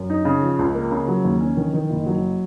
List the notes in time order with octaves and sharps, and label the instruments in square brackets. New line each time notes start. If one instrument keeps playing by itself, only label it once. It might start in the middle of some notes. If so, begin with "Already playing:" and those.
Already playing: [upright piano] F#2
D#4
C#3
F3
C#2
A#3
C#3
F#3
D#2
C#4
D#3
D#3
F#1
F#3